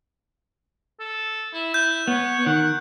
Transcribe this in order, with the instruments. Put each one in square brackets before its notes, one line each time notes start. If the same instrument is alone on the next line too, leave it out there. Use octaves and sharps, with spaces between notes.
[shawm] A4
E4
[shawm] E4 [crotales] G6
[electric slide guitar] B3 [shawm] C#5
[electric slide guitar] D#3 [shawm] F#5